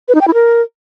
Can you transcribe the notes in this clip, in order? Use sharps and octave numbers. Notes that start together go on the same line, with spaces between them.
B4
D#4
G5
E4
A#4